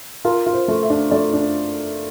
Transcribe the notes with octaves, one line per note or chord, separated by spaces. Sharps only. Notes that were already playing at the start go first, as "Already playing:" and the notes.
F4 A#4
F4
C5
A3
E5
D4
A3 D5
D4